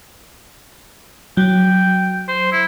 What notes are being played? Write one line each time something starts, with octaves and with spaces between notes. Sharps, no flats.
F#3 G5
C5
E4